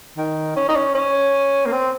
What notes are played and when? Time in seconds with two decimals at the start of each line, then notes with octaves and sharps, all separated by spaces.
0.18 D#3
0.56 C#4
0.69 D#4
0.76 C#4
0.95 C#4
1.66 A#3
1.72 C4